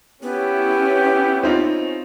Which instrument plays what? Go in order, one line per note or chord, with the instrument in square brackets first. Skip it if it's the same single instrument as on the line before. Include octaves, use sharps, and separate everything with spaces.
[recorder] B3 [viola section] C#4 E4 [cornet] G4
[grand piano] C4 D#4 F4